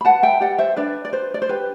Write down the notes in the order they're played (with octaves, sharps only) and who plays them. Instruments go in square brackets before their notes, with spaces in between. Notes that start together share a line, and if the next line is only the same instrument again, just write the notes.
[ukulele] B5
B4 F#5 A5
E5 G5
G4 D5 F#5
C5 E5
D4 B4 D5
D5
B4 C5
D5
C5
G4 B4